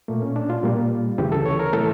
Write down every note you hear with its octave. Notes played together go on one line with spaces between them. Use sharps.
A#2 A3 A#3
C#4
D4
F4
A#2 G3 A#3
D2 C#3 E3 G4
A4
C#5
A#4
A2 E3 A3 A4